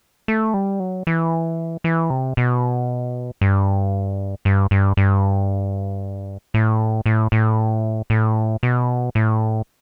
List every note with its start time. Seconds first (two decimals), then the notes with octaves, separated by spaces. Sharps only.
0.28 A3
0.54 G3
0.80 F#3
1.07 E3
1.84 E3
2.10 C3
2.37 B2
3.41 G2
4.45 G2
4.71 G2
4.97 G2
6.54 A2
7.06 A2
7.32 A2
8.10 A2
8.63 B2
9.15 A2